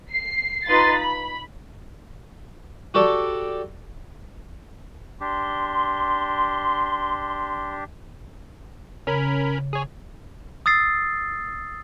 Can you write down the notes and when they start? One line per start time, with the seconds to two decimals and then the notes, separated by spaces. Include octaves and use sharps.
0.10 C7
0.67 D#4 F4 B4 C6 A6
0.98 B5
2.94 F#4 G4 A4 D5
5.21 D4 G4 C6
9.07 C#3 C#4 A#4 B5
9.73 G#4 C#5
10.66 D#6 E6 A6 C7